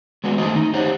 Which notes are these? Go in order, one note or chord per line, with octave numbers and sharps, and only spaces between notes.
G#3 B3 F#4
E2 D#3 F#3 A3 C5 D#5
D#4
G4 C5 C#5 F#5